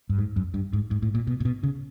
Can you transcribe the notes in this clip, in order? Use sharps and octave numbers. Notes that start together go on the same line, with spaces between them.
G2
G#2
F#2
G2
G#2
G#2
A2
A#2
B2
A#2
B2
C#3